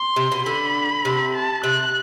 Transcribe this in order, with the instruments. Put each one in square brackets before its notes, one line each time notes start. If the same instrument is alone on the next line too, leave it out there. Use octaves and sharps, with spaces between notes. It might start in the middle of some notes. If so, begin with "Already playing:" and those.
Already playing: [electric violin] C6
[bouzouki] C3
B2
[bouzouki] D3 [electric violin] B5
[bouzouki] C3
[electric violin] A5
[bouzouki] C3 [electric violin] F#6